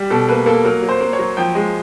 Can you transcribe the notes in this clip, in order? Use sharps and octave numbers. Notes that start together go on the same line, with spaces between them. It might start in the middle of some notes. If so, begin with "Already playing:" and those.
Already playing: G3
B2 A4
A#3 B4
A#3 A4
F#3 A#4
F#3
C5
A#3
C#5
F#3
F3 G5
G#3